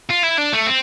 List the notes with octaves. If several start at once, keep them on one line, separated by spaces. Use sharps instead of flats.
F4
E4
D4
A3
C4